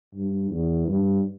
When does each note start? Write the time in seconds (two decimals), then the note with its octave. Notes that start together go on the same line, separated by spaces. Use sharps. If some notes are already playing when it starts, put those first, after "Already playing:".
0.14 G2
0.51 E2
0.87 G2